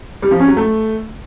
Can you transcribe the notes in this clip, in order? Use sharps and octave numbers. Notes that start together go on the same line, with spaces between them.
G3
F3
C#4
F#3
A3